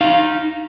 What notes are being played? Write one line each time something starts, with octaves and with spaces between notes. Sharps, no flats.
D#4 F5